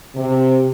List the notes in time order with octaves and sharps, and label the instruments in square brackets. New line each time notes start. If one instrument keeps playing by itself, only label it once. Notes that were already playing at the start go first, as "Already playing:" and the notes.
[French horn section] C3